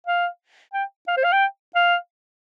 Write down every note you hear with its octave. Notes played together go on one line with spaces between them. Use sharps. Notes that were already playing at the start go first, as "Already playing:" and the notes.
F5
G5
F5
C5
F5
G5
F5